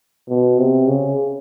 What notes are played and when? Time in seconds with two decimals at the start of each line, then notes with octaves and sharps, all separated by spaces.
0.29 B2
0.59 C3
0.88 C#3